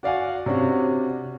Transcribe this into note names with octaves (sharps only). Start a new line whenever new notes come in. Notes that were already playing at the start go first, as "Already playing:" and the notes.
F#4 D5 F5 F#5 G#5
C3 C#4 D4 F#4